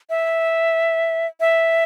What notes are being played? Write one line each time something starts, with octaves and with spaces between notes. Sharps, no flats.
E5
E5